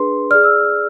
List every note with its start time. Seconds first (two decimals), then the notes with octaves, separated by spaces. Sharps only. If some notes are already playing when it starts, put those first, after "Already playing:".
Already playing: D4 G#4 B4 C6
0.31 G#4 D5 F6
0.44 E6